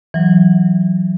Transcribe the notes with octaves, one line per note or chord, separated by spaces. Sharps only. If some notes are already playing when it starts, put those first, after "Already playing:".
E3 F#3